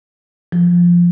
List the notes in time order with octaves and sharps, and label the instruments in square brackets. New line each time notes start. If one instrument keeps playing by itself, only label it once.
[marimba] F3